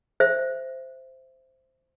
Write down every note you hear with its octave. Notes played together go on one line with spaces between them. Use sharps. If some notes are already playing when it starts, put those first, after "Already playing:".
C5 E5